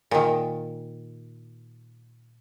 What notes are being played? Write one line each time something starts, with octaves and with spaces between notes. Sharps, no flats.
A#2 D#3